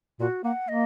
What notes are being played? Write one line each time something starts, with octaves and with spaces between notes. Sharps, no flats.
A#2 F#4
A#3 F#5
A#3 D#5